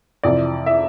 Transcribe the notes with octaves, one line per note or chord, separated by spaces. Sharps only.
F2 C3 E3 D5
E5